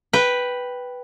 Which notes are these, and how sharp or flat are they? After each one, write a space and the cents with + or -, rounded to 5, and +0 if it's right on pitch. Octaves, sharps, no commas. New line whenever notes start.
B4 +0 G5 +0